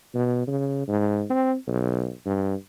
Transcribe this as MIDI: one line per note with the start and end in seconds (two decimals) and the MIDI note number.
0.14 0.46 47
0.47 0.86 49
0.88 1.24 44
1.30 1.54 60
1.67 2.11 35
2.26 2.55 43